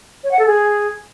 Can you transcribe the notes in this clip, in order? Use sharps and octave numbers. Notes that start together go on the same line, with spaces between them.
C#5
F#5
A4
G#4